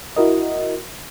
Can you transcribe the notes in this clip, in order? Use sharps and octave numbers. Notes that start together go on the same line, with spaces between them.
E4 F#4 A#4 D#5